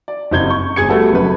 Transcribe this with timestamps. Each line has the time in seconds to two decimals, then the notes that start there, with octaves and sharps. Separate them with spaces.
0.08 D5
0.31 F#1 C3 D#4 G6 G#6 G7
0.50 C#6
0.76 G1 G#4 G#6 C#7
0.89 G3 A3 B3 F#4 A4
1.12 F#1 F#2 B4